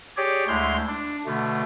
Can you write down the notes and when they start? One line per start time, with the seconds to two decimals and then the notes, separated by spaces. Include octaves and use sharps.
0.17 G4 G#4 C#5 D5
0.48 D2 G#3 E4 C6 F6 G6
0.87 D4
1.26 B2 D3 A3